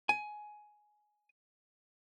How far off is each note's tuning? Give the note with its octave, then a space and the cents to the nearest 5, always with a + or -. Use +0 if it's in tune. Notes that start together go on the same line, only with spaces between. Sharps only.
G#5 +15